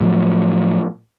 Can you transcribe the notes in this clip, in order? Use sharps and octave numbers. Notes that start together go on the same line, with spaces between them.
A2 F3 F#3